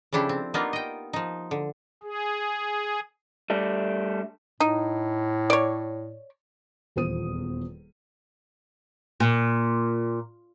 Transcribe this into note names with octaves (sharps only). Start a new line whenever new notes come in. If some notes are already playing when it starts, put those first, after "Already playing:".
C#3 F3 D4 E4 G4 A4
C4
A#3 B3 D4 D#4 F4
D#5 G5
F3 D#4
D3
G#4
G3 A3 D4
A2 D#4
C#5 D5
D#1 E2 F4 C5 D#6 D#7
A#2